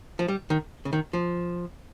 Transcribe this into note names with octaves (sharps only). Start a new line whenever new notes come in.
F3
G3
D#3
C#3
D#3
F3